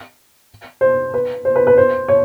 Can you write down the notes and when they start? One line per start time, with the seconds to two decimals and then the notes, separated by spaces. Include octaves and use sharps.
0.81 C5
1.14 B4
1.45 C5
1.56 B4
1.67 B4
1.77 C5
2.08 C#5